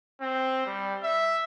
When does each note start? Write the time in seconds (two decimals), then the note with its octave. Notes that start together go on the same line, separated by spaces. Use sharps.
0.21 C4
0.66 G3
1.03 E5